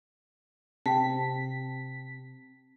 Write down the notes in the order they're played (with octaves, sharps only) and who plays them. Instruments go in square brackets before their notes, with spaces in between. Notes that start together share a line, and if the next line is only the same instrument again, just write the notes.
[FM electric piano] C3 B6 [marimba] G5 A5